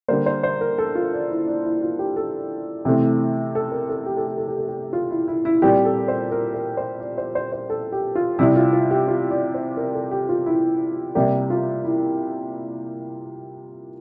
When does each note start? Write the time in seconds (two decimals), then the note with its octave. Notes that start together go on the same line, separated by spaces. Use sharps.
0.08 D3 G3 A#3 C5
0.26 C5
0.43 C5
0.61 A#4
0.78 A4
0.95 F4
1.13 D4
1.30 E4
1.47 D4
1.64 E4
1.82 F4
1.99 G4
2.16 A4
2.85 C3 E3 A3 C4
3.55 A4
3.72 A#4
3.89 A4
4.06 G4
4.17 A4
4.27 G4
4.38 A4
4.48 G4
4.58 A4
4.68 G4
4.93 F4
5.11 E4
5.28 E4
5.45 E4
5.62 A#2 G3 C4 G4
5.85 A4
6.08 C5
6.32 A#4
6.54 A#4
6.77 C5
7.00 D5
7.18 C5
7.35 C5
7.52 C5
7.70 A4
7.92 G4
8.15 F4
8.39 C3 G3 C4 E4
8.56 F4
8.73 F4
8.91 G4
9.08 F4
9.31 D5
9.54 C5
9.77 A#4
9.94 A4
10.11 G4
10.29 F4
10.46 E4
11.15 C3 G3 A#3 G4
11.50 F4
11.84 E4